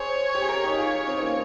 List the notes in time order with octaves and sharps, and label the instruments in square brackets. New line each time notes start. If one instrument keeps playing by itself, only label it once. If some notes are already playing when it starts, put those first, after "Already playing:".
Already playing: [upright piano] G#4 C5 [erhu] C#5
[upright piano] G4
G#4
G4 A#4
D#4 G4
[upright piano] F4 G#4 [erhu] C#5
[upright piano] C4 D#4
A#3 C#4